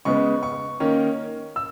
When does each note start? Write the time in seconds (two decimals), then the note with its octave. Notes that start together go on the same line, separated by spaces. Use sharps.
0.05 C#3 G#3 B3 C#6
0.43 C#6
0.80 D#3 A#3 C#4
1.56 E6